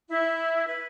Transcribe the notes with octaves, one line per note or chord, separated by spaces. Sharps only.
E4
B4